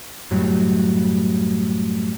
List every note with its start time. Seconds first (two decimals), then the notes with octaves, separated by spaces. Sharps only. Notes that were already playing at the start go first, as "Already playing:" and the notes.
0.31 F#2 A2 F#3 G3